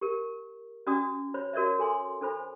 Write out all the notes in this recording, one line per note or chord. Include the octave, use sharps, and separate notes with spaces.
G4 A#4
C#4 D4 F#4 D5 D6 D#6
C5 C#5 B5
F#4 A#4 C#5 D5 E5
A4 G#5 C6
D4 A4 C5 B5